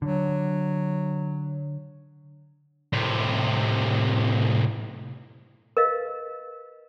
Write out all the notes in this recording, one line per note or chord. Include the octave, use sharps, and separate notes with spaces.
D3 F#3
A2 C3
A#4 B4 D#5 F5